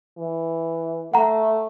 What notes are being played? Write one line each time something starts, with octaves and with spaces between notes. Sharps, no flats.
E3
A3 F#5 A#5